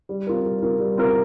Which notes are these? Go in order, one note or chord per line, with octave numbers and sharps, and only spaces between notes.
G3
C4 F4 A#4
G3
C4 F4 A#4
G3
C4 F4 A#4